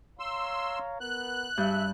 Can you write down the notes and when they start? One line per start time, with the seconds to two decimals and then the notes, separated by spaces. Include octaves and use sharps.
0.19 C#5 F5 A#5 C6 E6
1.01 B3 A#4 F#6
1.58 G2 G#3 D4 E5 G6